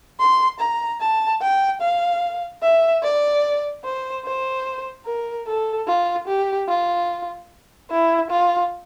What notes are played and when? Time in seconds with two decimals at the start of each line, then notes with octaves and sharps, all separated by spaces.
0.20 C6
0.60 A#5
1.01 A5
1.41 G5
1.81 F5
2.62 E5
3.03 D5
3.84 C5
4.25 C5
5.06 A#4
5.47 A4
5.88 F4
6.28 G4
6.69 F4
7.91 E4
8.31 F4